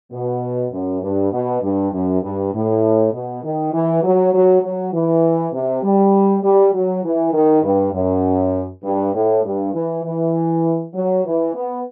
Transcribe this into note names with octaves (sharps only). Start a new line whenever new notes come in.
B2
F#2
G2
B2
G2
F#2
G2
A2
B2
D#3
E3
F#3
F#3
F#3
E3
C3
G3
G3
F#3
E3
D#3
G2
F#2
G2
A2
G2
E3
E3
F#3
E3
B3